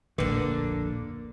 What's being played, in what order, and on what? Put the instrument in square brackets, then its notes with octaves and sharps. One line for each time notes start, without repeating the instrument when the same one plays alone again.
[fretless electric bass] D1 A#1 F2 [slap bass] D3 [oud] A#3 B4